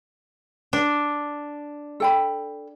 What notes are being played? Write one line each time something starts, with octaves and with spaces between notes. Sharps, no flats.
D4
A4 G5 B5